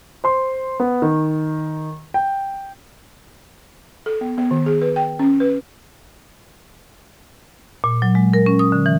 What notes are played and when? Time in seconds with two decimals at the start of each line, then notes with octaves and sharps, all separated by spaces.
0.24 C5 C6
0.80 B3
1.02 D#3
2.14 G5
4.06 A4
4.21 B3
4.38 B3
4.51 D#3
4.66 G#4
4.82 B4
4.96 G5
5.19 C#4
5.40 B4
7.84 A#2
8.02 F#3
8.15 G#3
8.34 A#4
8.46 C#4
8.59 D#6
8.72 D3
8.86 E3